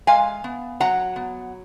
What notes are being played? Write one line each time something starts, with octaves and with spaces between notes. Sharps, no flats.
G#3 F5 G#5
B3
F#3 F#5 A#5
B3